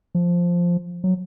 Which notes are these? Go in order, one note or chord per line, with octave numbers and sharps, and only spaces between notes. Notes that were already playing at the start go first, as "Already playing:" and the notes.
F3
F#3